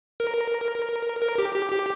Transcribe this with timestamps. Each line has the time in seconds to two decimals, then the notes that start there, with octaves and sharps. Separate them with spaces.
0.20 A#4
1.22 A#4
1.38 G4
1.55 G4
1.72 G4